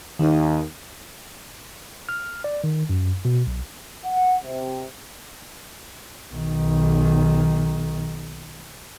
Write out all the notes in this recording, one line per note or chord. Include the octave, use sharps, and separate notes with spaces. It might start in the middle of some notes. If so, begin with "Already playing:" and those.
D#2 D#3 D#4
F6
D5
D#3
F#2
B2
B1
F#5
C3
B1 D#3